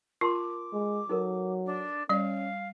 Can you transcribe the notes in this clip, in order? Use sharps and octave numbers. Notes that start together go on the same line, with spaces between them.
F4 A#4 A5 C6 D6
G#3
F#3 D#4 A4 A#4
D4
G3 C#4 D5 F5